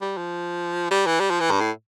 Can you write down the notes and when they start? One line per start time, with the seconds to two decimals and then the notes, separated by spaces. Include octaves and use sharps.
0.02 G3
0.17 F3
0.91 G3
1.06 E3
1.20 G3
1.30 F3
1.40 E3
1.51 G2
1.60 A2